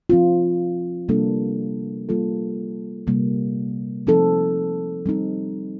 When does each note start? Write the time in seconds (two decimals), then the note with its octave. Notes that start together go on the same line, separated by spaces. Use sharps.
0.10 F3 C4 F4
1.09 C3 G3 A#3 D4 A4
2.09 G3 A#3 F4 A4
3.07 C3 G3 A#3
4.07 F3 C4 D#4 A4
5.06 G3 C4 D#4